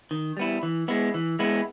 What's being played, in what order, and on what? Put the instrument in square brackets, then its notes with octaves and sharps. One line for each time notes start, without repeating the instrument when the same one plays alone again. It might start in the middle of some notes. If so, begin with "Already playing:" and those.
[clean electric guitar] D#3
G3 B3 E4
E3
G#3 B3 E4
E3
G#3 B3 E4